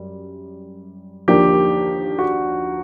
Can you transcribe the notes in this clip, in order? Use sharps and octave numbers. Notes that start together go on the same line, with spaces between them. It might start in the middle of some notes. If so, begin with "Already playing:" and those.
Already playing: F#2 G3
D#2 D3 F3 A#3 D4 G4
F#4